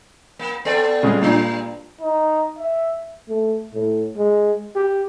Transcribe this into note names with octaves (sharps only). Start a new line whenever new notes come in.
A#3
B3 A4 D5
C#3 G3 G#3
G2 A#2 G3 D4
D#4
E5
A3
A2
G#3
G4